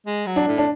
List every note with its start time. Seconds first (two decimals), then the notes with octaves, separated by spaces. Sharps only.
0.06 G#3
0.26 F#3
0.36 D4
0.47 A2
0.58 D4